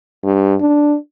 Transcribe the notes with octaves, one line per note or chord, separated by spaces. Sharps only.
G2
D4